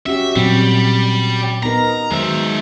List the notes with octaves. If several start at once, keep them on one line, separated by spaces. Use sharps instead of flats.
C#4 F#4 G4 E5
A#2 F#3 G3 C4
B3 D#4 A#4 A#5
D#3 F#3 G#3 C5 E5